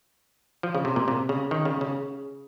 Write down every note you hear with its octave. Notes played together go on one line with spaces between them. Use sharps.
F3
C#3
C3
A#2
C3
C#3
D#3
C#3
C#3